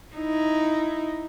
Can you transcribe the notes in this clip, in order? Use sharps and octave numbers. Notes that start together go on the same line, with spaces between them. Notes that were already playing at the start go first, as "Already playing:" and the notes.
D#4 E4